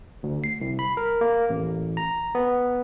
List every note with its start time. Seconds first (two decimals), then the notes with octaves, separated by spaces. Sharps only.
0.23 D2
0.44 C7
0.61 C2
0.79 B5
0.97 A#4
1.21 A#3
1.50 A1
1.97 A#5
2.35 B3